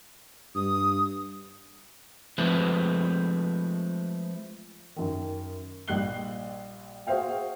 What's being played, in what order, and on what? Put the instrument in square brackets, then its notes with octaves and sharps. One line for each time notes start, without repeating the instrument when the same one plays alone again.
[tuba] G2 [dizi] D#6
[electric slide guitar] F3 G#3 A3 C4 B4
[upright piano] F#2 D#3
A#1 G3 D#5 F#6 C7 G7
F#4 G#4 C5 E5 F5 G5